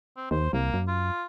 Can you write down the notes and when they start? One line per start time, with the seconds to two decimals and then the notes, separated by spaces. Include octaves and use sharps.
0.17 C4
0.31 D#2 C5
0.53 C2 A#3
0.74 F#2
0.88 F4